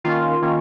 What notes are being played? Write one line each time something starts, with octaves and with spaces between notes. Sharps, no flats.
D#3 A#3 C#4 F4
D#3 A#3 C#4